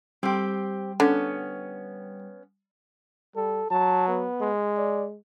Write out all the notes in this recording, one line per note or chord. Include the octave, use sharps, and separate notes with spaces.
G3 C4 G4
D3 B3 C#4
G3 A4
F#3 A5
B3
G#3
D5